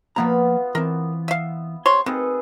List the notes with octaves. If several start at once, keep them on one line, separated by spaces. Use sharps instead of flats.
F3 A#3 B3 F4 A#5 B5
E3 C4 A#4
E5 F5
C3 C#5 C6
D#3 C4 G#4 A4 B4